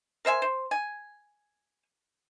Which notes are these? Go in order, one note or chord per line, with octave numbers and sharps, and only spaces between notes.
A#4 C5 E5 G#5
C5
G#5